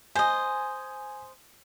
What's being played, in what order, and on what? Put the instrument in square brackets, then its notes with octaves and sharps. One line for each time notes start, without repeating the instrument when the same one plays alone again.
[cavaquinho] C5 D#5 [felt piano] G#5